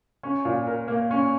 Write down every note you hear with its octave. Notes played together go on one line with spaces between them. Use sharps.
C#4
A#2
A#4
A#3
C#4